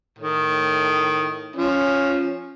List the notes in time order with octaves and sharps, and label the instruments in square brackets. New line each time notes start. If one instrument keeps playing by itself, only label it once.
[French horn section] A2 [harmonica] D#3
[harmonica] F3 [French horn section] C#4